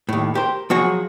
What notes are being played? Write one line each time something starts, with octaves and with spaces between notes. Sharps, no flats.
D#2 A2
G4 A#4 C5
F3 F#3 F#4 G#4 C#5